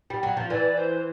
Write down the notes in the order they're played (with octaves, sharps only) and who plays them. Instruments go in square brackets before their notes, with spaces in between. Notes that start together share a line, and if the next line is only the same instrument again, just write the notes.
[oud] G3
F#3
F3
[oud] E3 [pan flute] D5
[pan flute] C5